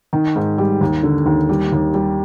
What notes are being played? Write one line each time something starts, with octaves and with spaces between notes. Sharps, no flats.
D#3
G#2
G3
D#2
D3
D#2
G3
D#2
G3